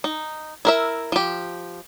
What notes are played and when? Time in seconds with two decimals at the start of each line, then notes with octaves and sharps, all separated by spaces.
0.04 D#4
0.65 E4 A#4 E5
1.12 F3 G4